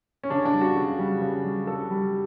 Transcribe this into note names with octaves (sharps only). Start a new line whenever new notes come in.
C#4
C#3 D4
D4
G3
F#4
C#3
G3
C#3
G3
C#3 A4
G3